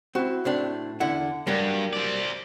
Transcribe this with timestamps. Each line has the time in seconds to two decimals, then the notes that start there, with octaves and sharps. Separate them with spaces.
0.15 C4 E4 F#4
0.45 A2 C4 D4
1.00 E2 D3 E4 F#5
1.47 G2 F#3 G3 A#3
1.93 C4 D5